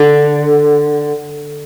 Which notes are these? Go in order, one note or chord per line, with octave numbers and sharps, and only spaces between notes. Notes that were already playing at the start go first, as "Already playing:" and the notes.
Already playing: D3